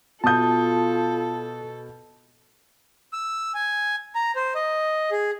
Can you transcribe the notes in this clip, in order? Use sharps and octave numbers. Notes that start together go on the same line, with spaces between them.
B2 F4 A4 A5 D#6 G6
E6
G#5
A#5
C5
D#5
G#4